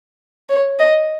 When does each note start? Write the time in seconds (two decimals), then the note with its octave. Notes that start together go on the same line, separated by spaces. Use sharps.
0.49 C#5
0.79 D#5